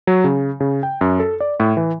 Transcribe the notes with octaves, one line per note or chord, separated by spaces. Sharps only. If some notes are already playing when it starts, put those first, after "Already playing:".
F#3
C#3
C#3
G5
F#2
A4
D5
A2
E3